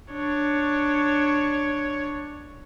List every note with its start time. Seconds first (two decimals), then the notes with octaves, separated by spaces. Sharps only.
0.13 D4 C#5